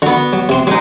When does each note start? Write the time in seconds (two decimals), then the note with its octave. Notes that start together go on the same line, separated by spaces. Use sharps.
0.02 D3 B3 F#4
0.33 F#3
0.49 C3 C4 C6
0.67 F#3 G#3 D#4